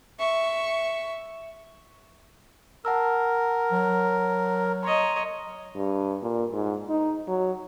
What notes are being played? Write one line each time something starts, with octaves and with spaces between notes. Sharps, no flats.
E5 C#6
A#4 F#5 A5 E6
F#3
C#5 D#5 A#5 C6
G2
A#2
G#2
D#4
F#3